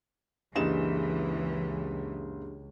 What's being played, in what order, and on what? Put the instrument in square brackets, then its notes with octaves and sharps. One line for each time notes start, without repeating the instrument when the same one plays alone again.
[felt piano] F#1 D#5 E7 [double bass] C#2 [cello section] E3 [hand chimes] D4 G4 G#4